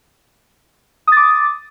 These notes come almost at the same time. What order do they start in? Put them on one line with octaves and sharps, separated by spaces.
D#6 A6 D6